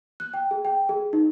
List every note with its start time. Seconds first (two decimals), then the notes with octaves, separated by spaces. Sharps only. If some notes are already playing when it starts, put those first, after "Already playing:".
0.20 F#6
0.34 G5
0.51 G#4
0.65 G5
0.89 G#4
1.13 D#4